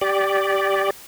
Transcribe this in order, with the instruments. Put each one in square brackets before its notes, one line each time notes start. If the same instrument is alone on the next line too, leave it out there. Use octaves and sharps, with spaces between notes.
[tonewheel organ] G4 D5